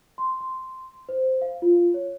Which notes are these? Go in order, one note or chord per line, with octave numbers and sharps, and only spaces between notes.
C6
C6
C5
F5
F4
C#5